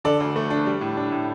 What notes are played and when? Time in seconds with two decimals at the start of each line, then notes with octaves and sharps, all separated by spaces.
0.04 D3 A4 D5
0.20 D2
0.36 A3
0.50 D4
0.66 G3
0.81 A2
0.97 D4
1.12 A2